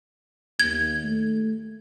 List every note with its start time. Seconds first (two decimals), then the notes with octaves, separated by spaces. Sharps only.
0.60 D#2 G#6
1.04 A3